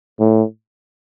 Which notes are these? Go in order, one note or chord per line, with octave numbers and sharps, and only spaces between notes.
A2